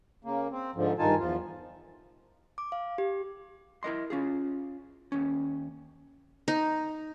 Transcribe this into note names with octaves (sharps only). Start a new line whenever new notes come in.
C#3 A#3
C4
G#2 D3 F3
G2 D#3 D#4 F4 G#5 A5
E2 F3 F4
D6
F5
G4
E4 A#4 D#5 C6
C#4 F4 G#4
D#2 C#4
D#4